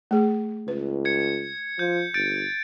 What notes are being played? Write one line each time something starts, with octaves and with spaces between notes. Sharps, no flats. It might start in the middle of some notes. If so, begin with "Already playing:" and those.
A3 G#4
C#2 B4
G#6 C#7
F3 G6
G1 G6 A6 D7